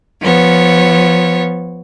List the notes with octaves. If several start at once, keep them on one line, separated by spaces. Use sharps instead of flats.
F3 B3 C#5